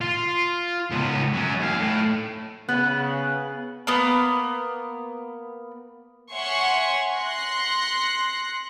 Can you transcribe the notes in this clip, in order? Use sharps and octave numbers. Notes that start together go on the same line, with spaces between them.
F4
C#2 B3
F#3 C#4
D#2 F5
A2
C#3 B3 F#6
A#3 B3
C#5 E5 F#5 G#5 C6 C#6
C6 F#6 A#6 C7 C#7